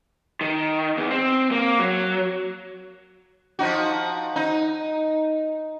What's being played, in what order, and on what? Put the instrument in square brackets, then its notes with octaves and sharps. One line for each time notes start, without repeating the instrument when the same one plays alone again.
[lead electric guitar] D#3
E2
C4
A#3
F#3
[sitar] F3 D#4 F#4
D#4